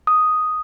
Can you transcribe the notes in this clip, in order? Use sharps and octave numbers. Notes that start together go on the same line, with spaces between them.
D#6